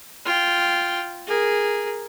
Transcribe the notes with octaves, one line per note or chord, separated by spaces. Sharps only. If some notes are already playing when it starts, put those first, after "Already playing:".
F4 G5
G#4 A#4